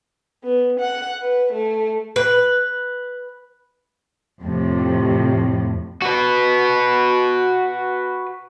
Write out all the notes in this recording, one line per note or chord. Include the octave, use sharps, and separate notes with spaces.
B3
F#5
B4
A3
B4
F2 A2 C3
F#4 B4